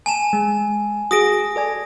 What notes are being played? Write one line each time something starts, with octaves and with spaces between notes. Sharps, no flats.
G#5 A5 E7
G#3
F#4 G#4 D#6 A#6 D7
A4 D5 G#5